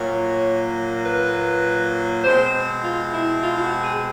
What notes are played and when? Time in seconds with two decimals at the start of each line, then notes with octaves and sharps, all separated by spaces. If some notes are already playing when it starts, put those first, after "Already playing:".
Already playing: A#2 F#3 A#3 C#5
1.04 B4
2.23 B2 G#3 C4 C5
2.83 F4
3.13 E4
3.42 F4
3.57 F4
3.62 F#4
3.82 G#4